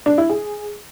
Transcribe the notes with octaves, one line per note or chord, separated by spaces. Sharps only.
D4
E4
G#4